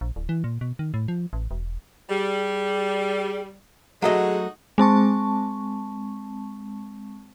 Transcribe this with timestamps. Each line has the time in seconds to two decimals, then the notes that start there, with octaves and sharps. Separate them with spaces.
0.01 A#1
0.16 D1
0.29 E3
0.44 A#2
0.61 B2
0.79 D#3
0.94 A2
1.08 F3
1.33 A1
1.51 E1
2.09 G3 G#4
4.02 F#3 G#3 A3 D#4 F#4 G#4 D#5
4.78 G#3 C4 A5 C#6